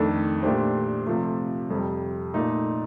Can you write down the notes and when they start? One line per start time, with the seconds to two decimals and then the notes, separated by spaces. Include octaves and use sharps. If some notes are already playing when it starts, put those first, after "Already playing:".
Already playing: F2 D#3 A3 D4 A4
0.43 A#2 A3 D4 G4 C5
1.06 C3 F3 A3
1.70 F2 C3 G3
2.33 A#2 A3 D#4 A4